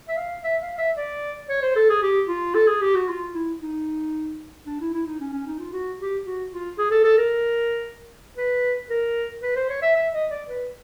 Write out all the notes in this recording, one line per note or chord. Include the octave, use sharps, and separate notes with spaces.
E5
F5
E5
F5
E5
D5
C#5
C5
A4
G#4
G4
F4
A4
G#4
G4
F#4
F4
E4
D#4
D4
E4
E4
D#4
C#4
C#4
D#4
F4
F#4
G4
F#4
F4
G#4
A4
A4
A#4
B4
A#4
B4
C5
C#5
E5
E5
D#5
D5
B4